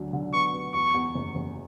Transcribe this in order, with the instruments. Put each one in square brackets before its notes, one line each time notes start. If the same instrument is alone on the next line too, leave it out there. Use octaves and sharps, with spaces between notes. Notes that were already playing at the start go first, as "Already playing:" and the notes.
Already playing: [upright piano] D2 D3 F#3
D3
[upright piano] B3 [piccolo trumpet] C#6
[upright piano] B3
[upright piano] E2 [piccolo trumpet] C#6
[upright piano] E2
F#1
F#1